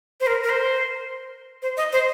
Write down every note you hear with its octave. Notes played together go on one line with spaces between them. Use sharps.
C5
A#4
A#4
C5
C5
D#5
C5